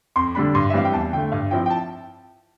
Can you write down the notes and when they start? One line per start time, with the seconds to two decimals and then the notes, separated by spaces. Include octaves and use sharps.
0.16 F2 C6
0.35 D3 G3 D4 B5
0.55 G2 C6
0.70 E5
0.73 E3 G3 C4 F5
0.85 G5
0.93 E2 A5
1.13 D3 G5
1.17 A3
1.32 G2 F5
1.51 F3 C4 E4 G5
1.66 G5
1.70 A5